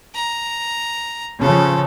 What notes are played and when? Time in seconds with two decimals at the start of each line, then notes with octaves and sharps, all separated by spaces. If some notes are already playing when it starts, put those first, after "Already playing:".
0.15 A#5
1.42 C#3 F3 A4